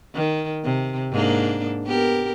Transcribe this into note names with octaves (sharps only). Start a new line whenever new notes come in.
D#3
C3
G#2 A#3 D4
B3 G4 A#4